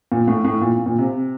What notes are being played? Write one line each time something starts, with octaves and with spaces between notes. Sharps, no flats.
A#2
A2
A2
A#2
A#2
C3